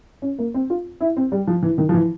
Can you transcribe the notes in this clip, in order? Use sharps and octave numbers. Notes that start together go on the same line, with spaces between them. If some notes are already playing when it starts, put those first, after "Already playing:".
C#4
A#3
C4
F4
E4
C4
G3
F3
E3
D#3
F3
E3